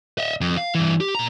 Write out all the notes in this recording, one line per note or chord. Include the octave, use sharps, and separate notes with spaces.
D#5 E5
F2
F5
G2 E3
G4
A#2 A#5